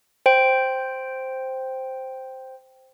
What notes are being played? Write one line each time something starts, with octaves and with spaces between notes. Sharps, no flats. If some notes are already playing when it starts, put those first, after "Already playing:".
C5 G5 D7